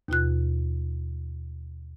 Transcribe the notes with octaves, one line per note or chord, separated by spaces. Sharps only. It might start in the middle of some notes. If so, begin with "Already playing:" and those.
D#2 B2 F4 F#6